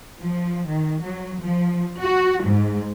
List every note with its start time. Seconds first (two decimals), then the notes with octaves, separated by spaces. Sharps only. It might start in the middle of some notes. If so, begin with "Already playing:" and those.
0.22 F3
0.70 D#3
1.02 F#3
1.42 F3
2.00 F#4
2.45 G#2